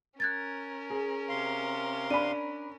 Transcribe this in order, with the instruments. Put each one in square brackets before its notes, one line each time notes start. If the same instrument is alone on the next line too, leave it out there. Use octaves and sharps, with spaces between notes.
[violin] C#4 A#4 [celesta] F#6 G#6 A6
[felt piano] G#4
[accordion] C3 F5 C6
[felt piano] D4 B5 [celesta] D#7